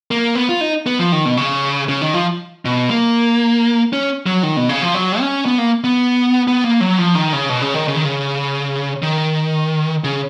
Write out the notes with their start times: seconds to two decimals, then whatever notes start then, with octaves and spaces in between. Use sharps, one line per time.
0.11 A#3
0.35 B3
0.49 F4
0.61 D#4
0.86 B3
0.99 F3
1.12 D#3
1.25 B2
1.37 C#3
1.89 C#3
2.02 D#3
2.14 F3
2.65 B2
2.90 A#3
3.93 C#4
4.26 F#3
4.43 D#3
4.57 B2
4.69 C#3
4.82 F3
4.94 F#3
5.20 C#4
5.46 B3
5.58 A#3
5.84 B3
6.48 B3
6.64 A#3
6.81 F#3
6.98 F3
7.15 D#3
7.33 C#3
7.49 B2
7.61 C#3
7.74 D#3
7.88 C#3
7.96 D#3
8.05 C#3
9.03 D#3
10.04 C#3